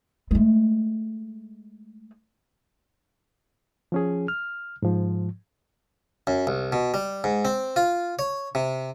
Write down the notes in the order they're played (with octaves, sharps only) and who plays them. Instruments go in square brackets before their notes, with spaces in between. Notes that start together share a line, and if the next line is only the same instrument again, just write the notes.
[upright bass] G#3 A3
[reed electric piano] F3 C#4 G#4
F6
G#2 F3
[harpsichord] F#2
C2
B2
G3
G#2
C4
F4
C#5
C3